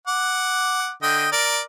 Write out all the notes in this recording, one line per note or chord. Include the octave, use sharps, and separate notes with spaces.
F#5 D6
D3 D#5 G5
A#4 D5